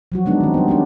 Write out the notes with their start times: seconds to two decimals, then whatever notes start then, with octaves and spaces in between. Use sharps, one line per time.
0.12 F3 F#3 F#4
0.26 G#3 B3 D4 D#4
0.41 D#3 C4
0.54 G3 B3
0.68 B3 C#4 D4